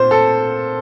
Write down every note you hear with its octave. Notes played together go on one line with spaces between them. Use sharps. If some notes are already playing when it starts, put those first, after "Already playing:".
Already playing: A#2 C4 C5
A4